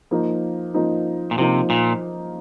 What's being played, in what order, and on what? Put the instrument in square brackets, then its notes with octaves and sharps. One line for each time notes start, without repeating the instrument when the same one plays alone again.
[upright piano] F3 A#3 D#4
F3 A#3 D#4
[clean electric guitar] A#2
[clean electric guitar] C3 [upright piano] F3 A#3 D#4
[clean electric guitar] A#2